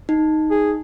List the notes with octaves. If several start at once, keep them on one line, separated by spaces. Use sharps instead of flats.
D#4
G#4